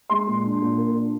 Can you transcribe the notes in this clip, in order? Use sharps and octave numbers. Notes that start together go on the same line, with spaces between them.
G#3 C6
A#2
D4
A#2
A#3
D4